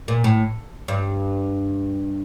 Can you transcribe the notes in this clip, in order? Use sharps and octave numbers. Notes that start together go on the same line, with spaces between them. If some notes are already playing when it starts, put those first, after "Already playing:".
A#2
A2
G2